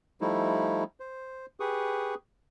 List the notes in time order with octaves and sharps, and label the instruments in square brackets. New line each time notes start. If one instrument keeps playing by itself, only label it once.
[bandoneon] F3 G3 A3 D#4 E4
C5
G4 G#4 B4 C#6 D#6